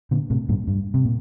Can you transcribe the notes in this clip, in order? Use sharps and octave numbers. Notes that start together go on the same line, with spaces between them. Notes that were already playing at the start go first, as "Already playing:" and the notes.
A#2 D3
A2 C3
G2 A#2
G2
C3
A#2